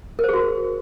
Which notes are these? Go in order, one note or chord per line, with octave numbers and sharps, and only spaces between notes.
F#4 G#4 A#4 C5